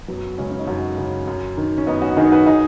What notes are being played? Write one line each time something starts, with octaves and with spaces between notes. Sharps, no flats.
F#2 F#3 B3
C#3 G#3 C#4
C#4
D#4
F#2 C#4 F#4
C#3
F#2
D#3
C#4
F#2 B3 D#4
C#4 F#4
D#3 D#4 G#4
F#4 B4
D#4 G#4